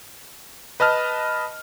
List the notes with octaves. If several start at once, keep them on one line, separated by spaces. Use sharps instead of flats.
B4 D#5 A5 F6